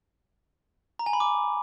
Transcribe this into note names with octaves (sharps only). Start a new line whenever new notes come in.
A#5
G#5
B5
D6